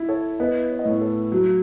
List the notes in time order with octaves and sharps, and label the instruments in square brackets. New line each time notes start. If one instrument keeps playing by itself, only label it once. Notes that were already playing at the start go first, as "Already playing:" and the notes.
Already playing: [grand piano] E4
[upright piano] A4 C#5
[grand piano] B3 [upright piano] B4 D#5
[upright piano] C#5
D#5
[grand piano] A2 [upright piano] A4 C#5
[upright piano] A4 C#5
[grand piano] F#3